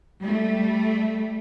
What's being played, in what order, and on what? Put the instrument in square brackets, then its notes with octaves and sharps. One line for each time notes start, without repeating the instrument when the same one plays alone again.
[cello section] G3 A3